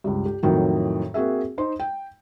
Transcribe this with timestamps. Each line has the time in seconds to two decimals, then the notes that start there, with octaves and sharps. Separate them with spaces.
0.04 C#2 G2
0.26 G4
0.43 F2 A2 D#3 F#3
1.14 A#3 C4 F#4 G#4 E5
1.58 D#4 C5 C6
1.80 G5